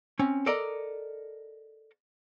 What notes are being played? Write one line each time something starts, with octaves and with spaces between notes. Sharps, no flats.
C4 C#4
A4 A#4 D5 D#5 A#5